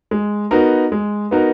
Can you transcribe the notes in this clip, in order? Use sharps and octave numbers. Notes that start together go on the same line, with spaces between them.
G#3
B3 D#4 F#4 A#4
G#3
B3 D#4 F#4 A#4